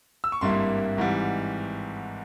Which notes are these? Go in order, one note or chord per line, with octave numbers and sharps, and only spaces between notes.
E6
C#6
G#1 G2 G3 A#3 E4 C6
G#1 G#2 E3 G3